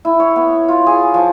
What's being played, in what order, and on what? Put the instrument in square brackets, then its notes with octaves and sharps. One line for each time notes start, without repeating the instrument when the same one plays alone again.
[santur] E4
C#5
B3
F4
G#4
F3